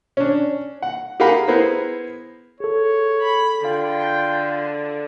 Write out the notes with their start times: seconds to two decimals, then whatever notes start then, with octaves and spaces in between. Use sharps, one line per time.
0.17 C#4 D4
0.82 F#5
1.20 G4 G#4 A#4 F5 F#5 B5
1.48 B3 E4 G#4 A#4 C5
2.60 G#4 A4 C#5
3.22 B5
3.65 D3 F4 G5